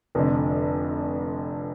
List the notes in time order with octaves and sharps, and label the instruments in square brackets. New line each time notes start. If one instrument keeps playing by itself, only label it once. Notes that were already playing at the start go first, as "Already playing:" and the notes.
[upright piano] F1 F2 D3